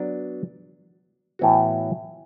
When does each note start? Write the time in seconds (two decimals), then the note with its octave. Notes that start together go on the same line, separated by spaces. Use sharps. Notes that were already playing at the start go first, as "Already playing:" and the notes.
Already playing: F#3 B3 D4
1.39 A2 E3 B3 F#4